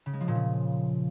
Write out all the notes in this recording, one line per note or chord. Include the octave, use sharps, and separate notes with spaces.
C#3
G#3
F3
A#2
C#3